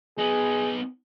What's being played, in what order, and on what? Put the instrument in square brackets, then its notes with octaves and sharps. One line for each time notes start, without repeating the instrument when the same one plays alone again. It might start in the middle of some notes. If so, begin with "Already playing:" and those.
[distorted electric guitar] B3 D#4 [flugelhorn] G#4